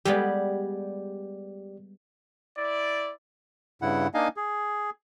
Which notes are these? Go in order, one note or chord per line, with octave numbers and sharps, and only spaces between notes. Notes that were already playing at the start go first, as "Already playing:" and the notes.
G3 G#3 B3 G4 D5
E4 D5
G2 C#3 E4 F#5
A#3 D4 D#4 D#5 F5 G#5
G#4